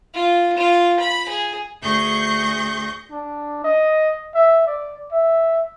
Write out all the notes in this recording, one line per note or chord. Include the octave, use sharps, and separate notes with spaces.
F4
F4
B5
G#4
D2 G#4 C#6 G6 A#6
D4
D#5
E5
D5
E5